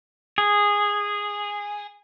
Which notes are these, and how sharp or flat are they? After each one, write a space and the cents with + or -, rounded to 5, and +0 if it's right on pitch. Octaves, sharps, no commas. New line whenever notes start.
G#4 -10